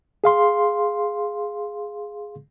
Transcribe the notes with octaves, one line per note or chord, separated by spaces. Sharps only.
G#4 F5 C6